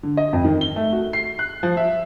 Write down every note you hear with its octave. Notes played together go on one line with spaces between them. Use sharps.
D3
D#5
F2
D#3
G7
A3
F#4
C7
F#6
F3
E5